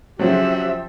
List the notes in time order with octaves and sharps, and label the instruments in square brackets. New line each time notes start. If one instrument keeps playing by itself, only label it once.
[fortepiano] C#3 F#3 [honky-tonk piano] F3 C4 C5 [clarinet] F#4 [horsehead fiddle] G4 E5